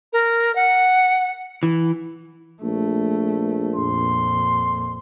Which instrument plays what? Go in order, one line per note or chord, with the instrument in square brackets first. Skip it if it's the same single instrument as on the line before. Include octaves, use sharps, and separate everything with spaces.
[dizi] A#4
F#5
[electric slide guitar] E3
[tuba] A#1 [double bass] A3
[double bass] F2 A#2 [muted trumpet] C6